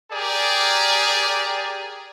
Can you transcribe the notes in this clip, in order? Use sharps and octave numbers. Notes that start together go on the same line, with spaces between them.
G4 G#4 A#4 D5